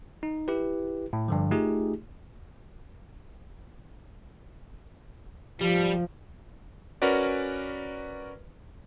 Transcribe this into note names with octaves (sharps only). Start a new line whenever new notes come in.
D#4
E4 G4 B4
A2
G2 D3 F3
A3 D#4 F4 G4 G#4
F3 G3
C#4 F#4 A#4 B4 D5